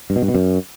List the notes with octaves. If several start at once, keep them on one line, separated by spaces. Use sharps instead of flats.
G2
B2
G2
B2
F#2